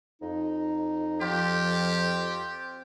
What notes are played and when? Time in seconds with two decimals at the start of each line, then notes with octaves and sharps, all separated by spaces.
0.22 F2 D#4
1.21 F3 C4 F4 G4 G5